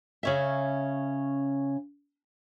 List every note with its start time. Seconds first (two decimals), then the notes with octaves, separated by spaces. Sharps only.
0.23 C#3 C#4 E5